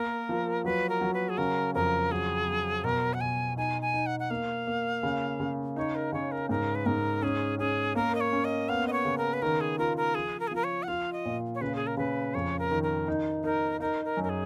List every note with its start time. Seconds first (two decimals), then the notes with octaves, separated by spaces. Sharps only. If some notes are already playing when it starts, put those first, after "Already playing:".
Already playing: A#3 A#4
0.29 F3
0.65 F#3 B4
0.89 A#4
1.01 F#3
1.14 B4
1.29 G#4
1.38 C#3 A#4
1.75 F2 A#4
2.11 F#3 G#4
2.48 F#3
2.84 B2 A#4
3.14 F#5
3.21 B2 G#5
3.57 D#4 G#5
3.82 G#5
3.94 D#4
4.06 F#5
4.20 F#5
4.30 A#3 F5
4.67 A#3
5.03 C#3
5.40 C#3
5.76 D#4 C#5
5.95 A#4
6.13 C#3 C#5
6.32 A#4
6.49 G#2 A#4
6.75 B4
6.86 G#2 A#4
7.22 C#4 G#4
7.59 C#4 G#4
7.95 A#3 A#4
8.15 D#5
8.20 C#5
8.33 C#4
8.45 D#5
8.69 B3 F5
8.87 D#5
8.93 C#5
9.05 C#3
9.18 A#4
9.33 B4
9.42 D#3 A#4
9.61 G#4
9.79 F4 A#4
9.97 A#4
10.15 F3 G#4
10.40 A#4
10.47 G#4
10.51 F3 A#4
10.64 C#5
10.83 F#5
10.88 F4 F5
11.13 D#5
11.25 A#2
11.55 C#5
11.61 C#3 B4
11.75 G#4
11.87 A#4
11.97 C#3 B4
12.34 F2 C#5
12.59 A#4
12.71 D#3
12.83 A#4
13.08 D#4
13.44 D#4 A#4
13.80 D#4 A#4
14.05 A#4
14.17 F#2
14.24 A#4
14.29 G#4